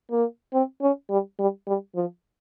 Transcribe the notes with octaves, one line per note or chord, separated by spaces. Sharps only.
A#3
C4
C#4
G3
G3
G3
F3